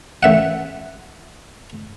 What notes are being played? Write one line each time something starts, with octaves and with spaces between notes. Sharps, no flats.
A1 E5 F#5